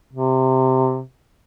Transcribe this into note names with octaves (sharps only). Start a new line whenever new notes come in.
C3